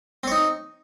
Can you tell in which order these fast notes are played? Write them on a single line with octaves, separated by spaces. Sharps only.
C4 C#5 D#4